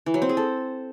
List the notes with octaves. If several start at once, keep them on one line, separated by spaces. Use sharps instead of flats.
E3
F#3
C4
G#4
A4